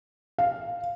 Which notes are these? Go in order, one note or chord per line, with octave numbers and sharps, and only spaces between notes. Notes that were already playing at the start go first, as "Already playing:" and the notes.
F5